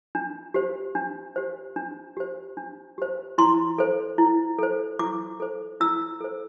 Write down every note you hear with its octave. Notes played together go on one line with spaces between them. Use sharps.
D4
G4 C5
D4
G4 C5
D4
G4 C5
D4
G4 C5
E4 C6
A4 C5
E4
A4 C5
E4 D6
A4 C5
E4 E6
A4 C5